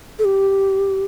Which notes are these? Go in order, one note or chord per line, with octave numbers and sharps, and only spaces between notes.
A4
G4